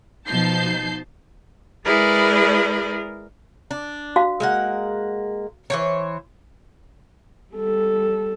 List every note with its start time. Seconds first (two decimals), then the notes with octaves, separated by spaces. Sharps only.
0.26 B2 F3 D#4 A5 G6 C7
1.85 G#3 E4 G#4 A#4 B4 D5
3.71 D4
4.16 F#4 F5
4.40 G#3 A#3 F#5
5.70 E3 C5 C#5
7.54 G3 A4